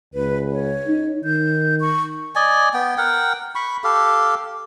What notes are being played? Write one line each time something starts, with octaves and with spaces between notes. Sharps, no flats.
C#2 B4
C#5
D#4
D#3 G6
C#6
D5 D#5 G#5
B3 G5
A#4 F#5 G5
B5 C#6
G4 A4 F5